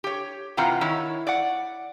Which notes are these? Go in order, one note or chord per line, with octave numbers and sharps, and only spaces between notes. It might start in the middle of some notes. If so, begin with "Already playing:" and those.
G4 C#5
C3 E3 C4 F4 F#5 A#5
D#3 E4 C#5
D5 F#5